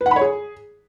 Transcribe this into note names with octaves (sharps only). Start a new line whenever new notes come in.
B4
F#5
B5
C#5
G#4